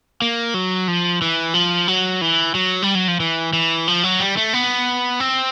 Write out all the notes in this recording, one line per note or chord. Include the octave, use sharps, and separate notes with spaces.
A#3
F#3
F3
E3
F3
F#3
E3
F#3
G3
F#3
F3
E3
E3
F3
F#3
G3
A3
B3
C4